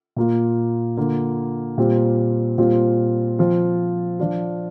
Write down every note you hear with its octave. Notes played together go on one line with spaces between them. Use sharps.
A#2 A#3 F4
D3 A#3 F4
A#2 G3 C4 F4
A#2 G3 C4 F4
F3 C4 F4
F3 D4 F4